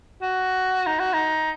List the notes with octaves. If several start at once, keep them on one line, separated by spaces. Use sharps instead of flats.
F#4
D#4
F#4
D#4